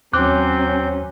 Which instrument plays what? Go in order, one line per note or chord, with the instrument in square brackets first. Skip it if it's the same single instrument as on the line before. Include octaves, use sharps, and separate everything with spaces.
[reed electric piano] D#2 D6 F#6 [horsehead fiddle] F#3 C#4 [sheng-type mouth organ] C4 G6